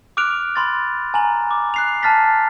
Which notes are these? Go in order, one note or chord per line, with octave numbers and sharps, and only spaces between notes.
D6 F6 F#6 D7 F7
B5 C6 A6
G#5 A#5 F#7
D6
F#6 C7 F7
A5 F6 A6 B6